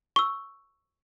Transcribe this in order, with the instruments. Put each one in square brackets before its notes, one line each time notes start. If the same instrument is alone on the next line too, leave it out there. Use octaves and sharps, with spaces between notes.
[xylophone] C#6 E6